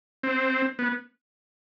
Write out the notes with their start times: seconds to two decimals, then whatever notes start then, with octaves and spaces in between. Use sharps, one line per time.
0.23 C4
0.79 B3